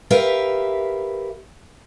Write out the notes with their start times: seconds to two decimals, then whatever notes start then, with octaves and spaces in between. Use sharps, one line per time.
0.11 G4 A#4 B4 E5 F5